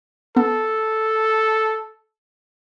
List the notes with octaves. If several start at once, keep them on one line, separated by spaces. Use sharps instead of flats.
B3 A4